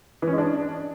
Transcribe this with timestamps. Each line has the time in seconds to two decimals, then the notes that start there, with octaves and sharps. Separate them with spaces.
0.22 E3
0.28 C#4
0.33 G#3
0.38 D4